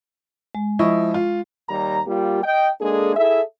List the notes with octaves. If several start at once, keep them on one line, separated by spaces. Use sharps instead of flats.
G#3
F3 E4 D#5 C#6
F4
D#2 G3 A#5
G3 A#3 F4 G4
D#5 G5
G#3 A#3 D4 G#4 A4
E4 G#4 A4 E5